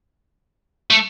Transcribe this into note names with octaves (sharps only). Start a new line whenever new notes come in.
A3